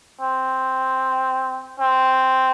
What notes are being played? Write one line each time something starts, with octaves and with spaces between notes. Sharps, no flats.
C4
C4